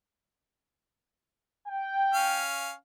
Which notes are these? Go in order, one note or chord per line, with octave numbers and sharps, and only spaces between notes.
G5
C#4 F5